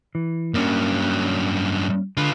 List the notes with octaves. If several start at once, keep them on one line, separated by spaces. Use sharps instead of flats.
E3
G2 F#3 A#3 C#4
D3 F4 B4